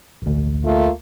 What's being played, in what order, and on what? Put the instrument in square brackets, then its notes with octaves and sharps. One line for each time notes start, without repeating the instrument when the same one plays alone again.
[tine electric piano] A1 D2
[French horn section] A3 A#3 F4